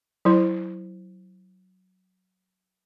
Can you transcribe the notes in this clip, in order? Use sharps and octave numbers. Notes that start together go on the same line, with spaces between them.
F#3 E4 C5